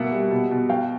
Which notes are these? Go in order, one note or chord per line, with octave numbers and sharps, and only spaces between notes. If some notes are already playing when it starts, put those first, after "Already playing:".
Already playing: B2 A#3 E5 F#5
G3
B2
B2
F#3 F5 G5